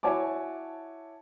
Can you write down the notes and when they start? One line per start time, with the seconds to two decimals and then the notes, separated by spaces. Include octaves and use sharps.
0.03 E4 F#4 C#5 G#5 A5 D6